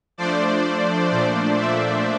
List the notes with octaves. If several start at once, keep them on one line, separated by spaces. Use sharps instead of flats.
F3 A3 D4 C5 D5
A#2 F3 A3 D4 C5 D5
D5 E5